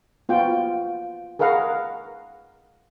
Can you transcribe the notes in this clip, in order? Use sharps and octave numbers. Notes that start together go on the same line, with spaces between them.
B3 F4 F#4 G5
G#4 A#4 B4 F5 F#5 A#5